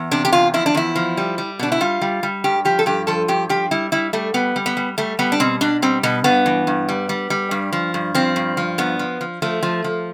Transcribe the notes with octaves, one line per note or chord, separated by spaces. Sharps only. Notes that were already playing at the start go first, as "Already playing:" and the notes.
Already playing: E2
C3 D4
G4
E2 F4
F3 E4
D4
E2 E4
F3
G3
G3
B2 D4
E4
G3 F4
G3
G3
G2 G4
F3 G4
A4
G2 G4
F3 A4
G2 G4
F3 G4
G3 E4
G3 E4
G3 A3
G3 B3
G3
B3
G3
G3 A3
G3 B3
D4
B2 C4
B2 D4
G3 C4
B2 B3
G2 B3
E3
G2
G3
G3
G3
G2
F3
G2
F3 C4
G2
F3
G2 B3
F3
F3
F3 A3
F3
F3